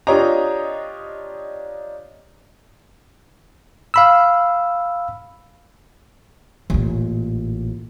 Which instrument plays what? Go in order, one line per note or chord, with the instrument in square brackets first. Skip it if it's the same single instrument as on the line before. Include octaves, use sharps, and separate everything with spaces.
[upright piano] D4 F4 G4 C#5 D#5 A#5
[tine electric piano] F5 B5 E6
[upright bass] A1 A#2